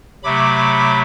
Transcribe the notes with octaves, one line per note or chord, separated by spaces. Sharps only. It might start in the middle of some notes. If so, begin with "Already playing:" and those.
C3 F#3 A3 B5 D6